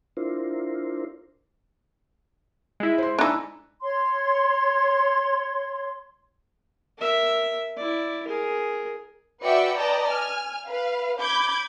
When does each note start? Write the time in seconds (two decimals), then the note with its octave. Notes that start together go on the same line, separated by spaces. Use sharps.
0.17 D4 E4 F4 A#4 C5
2.80 G#3 E4
2.98 C5 C6
3.19 D4 D#4 G#5 B5 E6
3.81 C#5 C6
6.98 A#4 E5
7.76 E4 D5
8.27 G#4 A#4
9.43 F#4 B4 D5 E5 G5 C#7
9.78 B4 D5 D#5 G5 A5 A#5
10.10 G#5 F6
10.68 B4 F5
11.20 B5 D6 G6 G#6